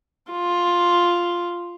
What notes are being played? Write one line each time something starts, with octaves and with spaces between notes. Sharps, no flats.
F4